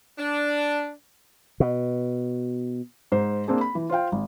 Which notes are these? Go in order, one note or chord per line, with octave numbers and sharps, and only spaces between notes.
D4
B2
G#2 C5
A#3 C4 D4 G#4
B5
E3
F4 C5 F5 G5
G#1